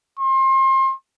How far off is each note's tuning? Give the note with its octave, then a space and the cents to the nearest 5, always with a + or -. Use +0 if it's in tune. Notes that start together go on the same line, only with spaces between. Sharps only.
C6 +30